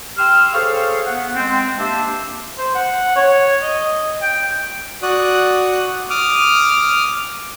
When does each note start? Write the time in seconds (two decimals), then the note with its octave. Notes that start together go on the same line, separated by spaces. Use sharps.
0.17 G4 G5 C6 E6 F6
0.54 G#4 A4 C5 C#5 F5
1.06 B3 F#5
1.35 G#3 C4 G5
1.78 A#3 D4 G4 C5 E5 A5
2.58 C5
2.75 F#5
3.16 C#5
3.62 D#5
4.22 G5
5.02 F#4 D5 D#6 F#6
6.10 D6 D#6 F6